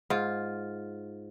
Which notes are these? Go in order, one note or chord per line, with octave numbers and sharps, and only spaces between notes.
G#2 F4